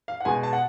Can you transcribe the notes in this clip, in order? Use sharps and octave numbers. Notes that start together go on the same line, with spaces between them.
F5
F#5
B2 G#3 G#5
A5
F#5